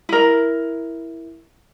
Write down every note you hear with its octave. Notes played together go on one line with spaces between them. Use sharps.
E4 A#4